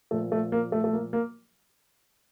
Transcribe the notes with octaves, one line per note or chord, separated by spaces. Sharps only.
A#2 F3 A3
A3
A#3
A3
A3
A#3
A#3